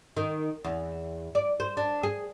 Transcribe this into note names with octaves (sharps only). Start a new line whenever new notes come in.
D#3
E2
D5
C5
D4
G#4